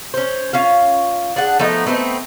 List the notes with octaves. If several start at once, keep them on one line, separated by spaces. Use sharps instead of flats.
C#4 C5
C#4 F4 F5
D4 G#4 F#5
F3 A3 B3 D#4
A3 B3 C4 D#4